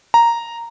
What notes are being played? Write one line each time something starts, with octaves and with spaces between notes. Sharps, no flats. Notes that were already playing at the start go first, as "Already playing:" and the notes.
A#5